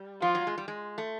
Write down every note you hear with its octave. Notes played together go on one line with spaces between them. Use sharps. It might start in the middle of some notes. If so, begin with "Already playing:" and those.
Already playing: G3
F3 F4
F#3
G#3
G3
G#3
A3